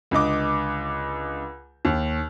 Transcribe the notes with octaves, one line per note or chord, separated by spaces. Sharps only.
C#2 D3 D#5 D6
D#2